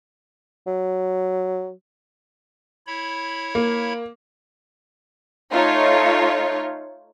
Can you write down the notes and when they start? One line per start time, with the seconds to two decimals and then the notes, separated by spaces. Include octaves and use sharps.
0.67 F#3
2.87 E4 C#5 B5
3.55 A#3
5.52 A3 D#4 F4 C#5